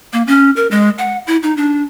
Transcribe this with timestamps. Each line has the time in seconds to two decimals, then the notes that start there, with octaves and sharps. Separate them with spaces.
0.13 A#3
0.27 C#4
0.56 A#4
0.71 G#3
0.98 F#5
1.27 E4
1.43 D#4
1.57 D4